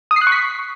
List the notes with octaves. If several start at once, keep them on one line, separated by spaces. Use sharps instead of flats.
D#6
C7
F#6
C#6
B6